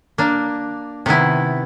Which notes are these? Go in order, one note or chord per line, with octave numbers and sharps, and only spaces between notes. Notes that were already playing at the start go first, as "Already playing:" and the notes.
A#3 D4
C3 D#3 B3 E4